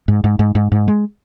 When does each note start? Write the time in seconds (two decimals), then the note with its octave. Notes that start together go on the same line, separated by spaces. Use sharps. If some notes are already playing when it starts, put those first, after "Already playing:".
0.08 G#2
0.24 G#2
0.39 G#2
0.55 G#2
0.72 G#2
0.88 G#3